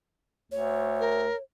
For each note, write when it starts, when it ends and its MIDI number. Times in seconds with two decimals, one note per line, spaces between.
0.52 1.28 38
0.52 1.43 73
1.00 1.36 70